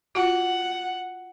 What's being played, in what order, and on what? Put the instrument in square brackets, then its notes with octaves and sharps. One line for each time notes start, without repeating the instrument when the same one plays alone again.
[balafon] F4 F#4 [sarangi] F#5